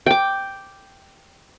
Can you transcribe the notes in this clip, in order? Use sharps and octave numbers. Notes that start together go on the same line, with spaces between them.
G5 D6